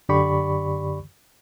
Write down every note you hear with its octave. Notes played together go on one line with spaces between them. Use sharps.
F#2 D3 G4 D5 B5 C#6